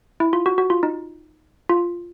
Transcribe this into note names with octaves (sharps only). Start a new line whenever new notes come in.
E4
F4
F#4
F#4
F4
D#4
F4